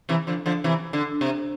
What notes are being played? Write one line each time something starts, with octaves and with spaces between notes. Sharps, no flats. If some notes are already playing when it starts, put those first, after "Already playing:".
C3 E3
D3 F3
D3 F3
C3 E3
D3
C3